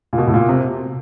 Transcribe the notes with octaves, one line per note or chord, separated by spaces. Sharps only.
A#2
B2
A2
A#2
C3